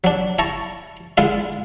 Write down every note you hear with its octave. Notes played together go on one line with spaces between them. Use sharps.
F#3 D4
E4 A5 A#5 C#6
D3 G#3 E4 F4